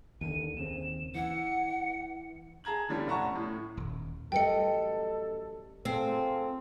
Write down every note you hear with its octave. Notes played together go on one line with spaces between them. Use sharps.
D#2 D3 D#7
D#2 C#3 C4 E7
E3 F#5 C#7
G#4 A5 A#5 G#6 F#7
D3 E3 G3 C#4 D4
F1 C#4 F#5 A5 A#5 C#6
A2
D#1
A1 F#2 G3 A4 B4 D#5 G5 C#7
C4 F4 G#4 A4